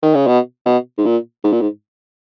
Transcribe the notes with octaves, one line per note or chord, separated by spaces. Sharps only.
D#3
C#3
B2
B2
G#2
A#2
G#2
A#2
G#2